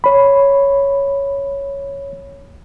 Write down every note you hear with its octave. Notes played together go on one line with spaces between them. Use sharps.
C#5 B5